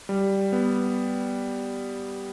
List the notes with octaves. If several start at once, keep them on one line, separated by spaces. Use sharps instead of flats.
G3
B3